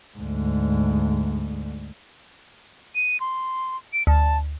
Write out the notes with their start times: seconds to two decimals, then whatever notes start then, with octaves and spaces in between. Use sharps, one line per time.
0.17 D2 G#2
2.95 D#7
3.20 C6
3.93 D7
4.07 D2 A5